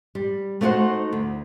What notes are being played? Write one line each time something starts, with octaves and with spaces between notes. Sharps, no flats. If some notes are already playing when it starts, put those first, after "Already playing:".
G3
A3 B3 D#4 F#4 C5 F#5
D2